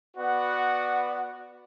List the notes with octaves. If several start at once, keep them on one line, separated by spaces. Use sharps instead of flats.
B3 F#4 B4 D5 F#5